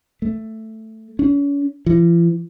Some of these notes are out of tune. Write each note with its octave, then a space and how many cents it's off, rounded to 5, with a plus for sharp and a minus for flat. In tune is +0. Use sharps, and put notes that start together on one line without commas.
A3 +5
C#4 +40
E3 +45